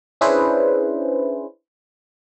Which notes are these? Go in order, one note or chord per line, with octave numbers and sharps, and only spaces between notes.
C#4 D4 E4 G#4 B4 C5